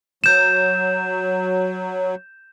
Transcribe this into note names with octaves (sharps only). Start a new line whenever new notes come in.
F#3 G6 E7